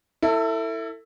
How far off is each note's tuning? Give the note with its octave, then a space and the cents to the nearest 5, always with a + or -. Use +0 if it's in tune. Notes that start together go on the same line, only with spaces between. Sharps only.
E4 +0 A4 +30